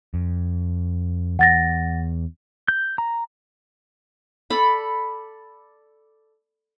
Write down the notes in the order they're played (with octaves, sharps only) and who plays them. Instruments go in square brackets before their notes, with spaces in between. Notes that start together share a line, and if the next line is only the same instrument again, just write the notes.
[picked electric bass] F2
[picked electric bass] E2 [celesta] F#5 A6 A#6
[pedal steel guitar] G6
A#5
[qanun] A4 D5 B5